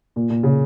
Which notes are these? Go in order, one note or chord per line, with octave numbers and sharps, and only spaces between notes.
A#2
A#2
C#3